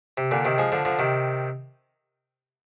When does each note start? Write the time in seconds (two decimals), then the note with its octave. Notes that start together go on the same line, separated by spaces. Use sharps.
0.17 C3
0.31 A#2 D3
0.45 C3 D#3
0.58 F3 G#3
0.72 D3 F3
0.85 D3 F3
0.99 C3 D#3